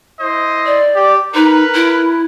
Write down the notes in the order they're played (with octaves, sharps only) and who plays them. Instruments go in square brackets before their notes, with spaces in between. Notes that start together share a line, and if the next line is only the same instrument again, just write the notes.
[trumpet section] E4 C5 D#5
[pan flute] D5
[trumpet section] G4
[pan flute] D#4 [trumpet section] A#4 B4
[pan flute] E4